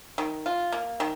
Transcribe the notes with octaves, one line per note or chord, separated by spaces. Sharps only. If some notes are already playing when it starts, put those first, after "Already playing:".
D#3
F4
A#3
D#3